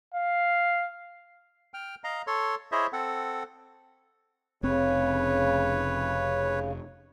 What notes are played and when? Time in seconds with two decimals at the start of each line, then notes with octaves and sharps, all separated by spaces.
0.14 F5
1.74 G5 F6
2.04 D#5 F5 A#5
2.27 A4 C#5 C6
2.72 E4 G#4 C5 C#5 D#5 E5
2.93 C4 A4 F#5
4.63 F1 C#3 C4 B4 C#5